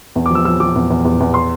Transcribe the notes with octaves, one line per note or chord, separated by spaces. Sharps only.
E2
D6
F3 E6
F3 E6
F3 D6
E2
E2
E2
E2
C6